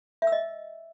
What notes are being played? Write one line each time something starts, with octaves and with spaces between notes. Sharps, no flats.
E5
E6
D#5